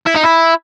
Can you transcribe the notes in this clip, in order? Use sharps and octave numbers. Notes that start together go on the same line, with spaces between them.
E4
D#4
E4